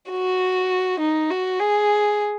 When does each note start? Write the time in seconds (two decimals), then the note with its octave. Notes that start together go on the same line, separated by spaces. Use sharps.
0.10 F#4
1.00 D#4
1.30 F#4
1.60 G#4